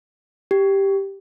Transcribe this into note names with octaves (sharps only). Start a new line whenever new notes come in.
G4